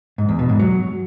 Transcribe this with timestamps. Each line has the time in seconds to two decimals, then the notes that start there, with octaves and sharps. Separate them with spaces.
0.18 G#2
0.29 E2
0.39 B2
0.49 G#2
0.59 F#3